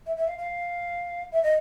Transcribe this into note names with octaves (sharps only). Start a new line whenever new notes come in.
E5
E5
F5
F5
E5
D#5